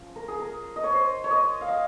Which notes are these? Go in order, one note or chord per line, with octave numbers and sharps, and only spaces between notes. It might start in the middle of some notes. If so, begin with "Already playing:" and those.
Already playing: F3 C#4 F4
A#4
G#4
A#4
D#5
C#5
C5
C#5
D#5
F5
D#5